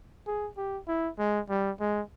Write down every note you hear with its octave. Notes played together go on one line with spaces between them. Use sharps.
G#4
G4
E4
G#3
G3
G#3